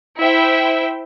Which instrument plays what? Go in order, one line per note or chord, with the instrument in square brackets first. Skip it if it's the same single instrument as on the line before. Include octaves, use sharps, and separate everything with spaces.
[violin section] E4 C5 E5 G5